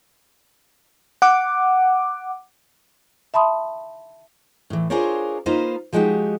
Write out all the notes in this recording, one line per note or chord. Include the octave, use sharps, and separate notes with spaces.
F#5 D6
E5 A5 B5 C6 D#6
A2 E3
D4 F4 G#4 A#4 C5 C#5
A#3 D#4 F4 B4 C5
F3 G#3 D#4 F#4 G4